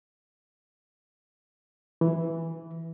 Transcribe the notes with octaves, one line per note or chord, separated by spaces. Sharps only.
E3